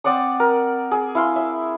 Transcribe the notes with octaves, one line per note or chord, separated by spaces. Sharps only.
C4 D5 F#5 D#6
A#4
G#4
E4 F5 C6
E5